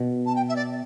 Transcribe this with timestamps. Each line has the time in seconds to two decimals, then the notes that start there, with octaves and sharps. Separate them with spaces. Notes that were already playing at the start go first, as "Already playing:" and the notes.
Already playing: B2
0.26 A5
0.35 G5
0.49 E5
0.56 D5